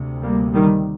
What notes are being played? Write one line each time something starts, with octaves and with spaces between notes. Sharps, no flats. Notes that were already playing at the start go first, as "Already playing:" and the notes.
Already playing: D2 C3
G3 A#3
D#3 G3